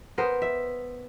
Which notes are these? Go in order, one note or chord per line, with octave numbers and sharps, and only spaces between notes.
B3 A#4 C5
E5